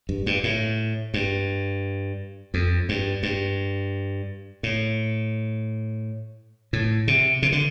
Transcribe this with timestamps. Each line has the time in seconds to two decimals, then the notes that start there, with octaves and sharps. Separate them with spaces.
0.09 G2
0.26 G2
0.44 A2
1.14 G2
2.54 F2
2.89 G2
3.23 G2
4.63 A2
6.73 A2
7.08 C3
7.42 C3
7.52 D3